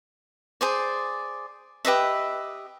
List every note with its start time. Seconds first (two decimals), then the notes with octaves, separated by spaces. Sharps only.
0.61 G#4 C5 D5
1.85 G4 B4 D#5 E5